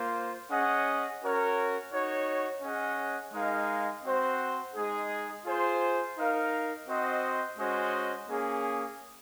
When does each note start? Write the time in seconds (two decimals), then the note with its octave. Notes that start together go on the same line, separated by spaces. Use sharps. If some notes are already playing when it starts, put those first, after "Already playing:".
Already playing: A#3 F4 C5
0.50 C#4 G#4 D#5 F#5
1.21 C#4 F#4 A#4 C#5
1.92 D#4 F#4 C#5
2.62 C#4 G#4 D#5 F#5
3.33 G#3 D#4 A#4 F5
4.04 C4 F#4 C5 F#5
4.75 G#3 D#4 G#4
5.46 F4 G#4 C5
6.17 D#4 A#4 F5
6.87 C4 F#4 C5 D#5 F#5
7.59 G#3 C#4 F#4 C5 D#5
8.29 A#3 C#4 G#4